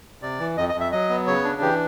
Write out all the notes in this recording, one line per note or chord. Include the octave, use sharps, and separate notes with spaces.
C3 D5
E3
F2 D#5
D#5
F2
E5
F#3 D#5
B3
C#3 C#5
D4
E3 G4